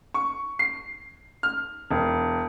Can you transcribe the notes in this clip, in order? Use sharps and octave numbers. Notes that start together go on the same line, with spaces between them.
C#6
C7
F6
E1